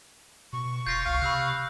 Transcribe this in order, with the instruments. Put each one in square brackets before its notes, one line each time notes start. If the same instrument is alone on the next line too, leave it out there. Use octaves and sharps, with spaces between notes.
[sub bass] B2 [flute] C#6
[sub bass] F1 [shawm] F4 [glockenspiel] G6 A#6 C7
[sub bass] C2 [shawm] F5
[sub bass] C3 [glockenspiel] B5 E6 F#6